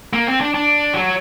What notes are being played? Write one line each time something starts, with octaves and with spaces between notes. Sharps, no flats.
A#3
C4
D4
D4
F#3